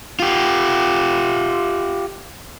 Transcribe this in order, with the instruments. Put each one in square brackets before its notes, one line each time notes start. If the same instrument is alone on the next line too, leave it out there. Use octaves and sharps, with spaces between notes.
[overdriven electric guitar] F4 G4